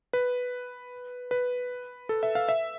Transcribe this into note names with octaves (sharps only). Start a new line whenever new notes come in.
B4
B4
A4
E5
F5
E5